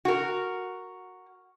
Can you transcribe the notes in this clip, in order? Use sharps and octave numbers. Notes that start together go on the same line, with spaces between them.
F#4 A#4